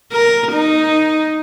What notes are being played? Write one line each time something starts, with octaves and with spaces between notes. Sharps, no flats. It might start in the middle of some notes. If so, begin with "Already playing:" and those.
A#4
D#4